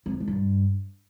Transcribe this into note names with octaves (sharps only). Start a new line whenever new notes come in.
F2
C3
D#3
G2